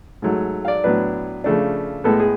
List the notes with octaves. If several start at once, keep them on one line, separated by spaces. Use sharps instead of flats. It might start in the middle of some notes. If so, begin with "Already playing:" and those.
G#2 F#3 A3
F5
D5
A2 F#3 B3 D4 B4
C#3 F3 A3 D4
A2 G#3 B3 A4
G#4